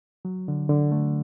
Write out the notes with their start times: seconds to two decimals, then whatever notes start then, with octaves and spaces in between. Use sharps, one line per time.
0.25 F#3
0.48 D3
0.69 D3
0.92 A3